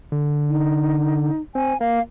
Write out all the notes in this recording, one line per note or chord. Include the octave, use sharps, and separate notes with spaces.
D3
D#4
C4 G#5
A#3 F5